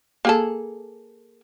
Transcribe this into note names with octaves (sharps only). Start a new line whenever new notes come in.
A#3 G#4 A4